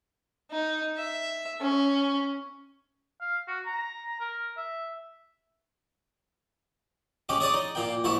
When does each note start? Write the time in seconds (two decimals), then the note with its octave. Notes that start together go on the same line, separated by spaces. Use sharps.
0.51 D#4
0.98 E5
1.60 C#4
3.21 F5
3.48 F#4
3.66 A#5
4.20 A#4
4.57 E5
7.29 G#3 C#4 G4
7.40 G#4 C#5 D5 D#6
7.54 D#4
7.75 A#2 A#3 G5
8.04 A#1 G#2 E4 C#5